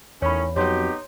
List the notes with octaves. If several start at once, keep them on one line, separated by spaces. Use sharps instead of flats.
E2 A2 D#3 C#4 C#5 B5
F2 F#3 B3 D#4 G4 C#5 C6 G6